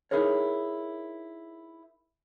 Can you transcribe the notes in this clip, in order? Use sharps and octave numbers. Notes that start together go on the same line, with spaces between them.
D#4 E4 G#4 A#4 C#5